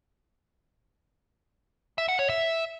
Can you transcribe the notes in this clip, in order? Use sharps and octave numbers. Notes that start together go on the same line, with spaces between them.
E5
F#5
C#5
E5